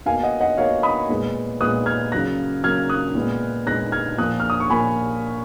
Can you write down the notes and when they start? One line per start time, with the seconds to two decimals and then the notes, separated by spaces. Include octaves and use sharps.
0.06 B2 A#3 F5 G#5
0.23 D#5 F#5
0.41 D#5 F#5
0.57 B2 A#3 C#5 F5
0.83 B5 D#6
1.09 A#2 G#3 B3
1.61 A#2 G#3 B3 D#6 F#6
1.86 F6 G#6
2.12 C#3 F#3 A#3 F#6 A#6
2.64 C#3 F#3 A#3 F6 G#6
2.90 D#6 F#6
3.15 A#2 G#3 B3
3.67 A#2 G#3 B3 F#6 A#6
3.92 F6 G#6
4.18 A#2 F3 A#3 D#6 F#6
4.40 F6
4.50 D#6
4.60 C#6
4.70 A#2 F3 A#3 G#5 B5